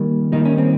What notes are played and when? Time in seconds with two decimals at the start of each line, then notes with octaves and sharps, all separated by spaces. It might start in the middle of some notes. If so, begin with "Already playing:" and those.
Already playing: D#3 G3 A#3
0.32 D#3 G3 A#3 D#4
0.45 C#4
0.58 C4